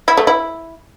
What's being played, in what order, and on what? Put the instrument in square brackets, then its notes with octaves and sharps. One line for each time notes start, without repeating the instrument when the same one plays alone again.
[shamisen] E4
A3
E4